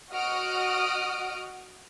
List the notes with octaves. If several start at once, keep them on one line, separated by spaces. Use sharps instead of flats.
F#4 D#5 F#5 D#6 F6 D7